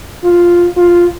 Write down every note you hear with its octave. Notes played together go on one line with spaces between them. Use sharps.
F4
F4